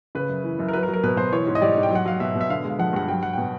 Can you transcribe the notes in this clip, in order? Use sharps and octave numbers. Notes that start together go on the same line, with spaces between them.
C#3 B4
F#2
E3
F#2
A#4
F#3 B4
A#4
F#3
A#4
B2 B4
B2 C5
E3 C#5
G#2
D#5
G3 D5
G#2
G5
F#3 F#5
F#3 F5
B2 E5
B2
E5
D3 F5
G#3
F5
F3 F#5
G2 F#5
F#3 G5
F#3 F#5
B2 G5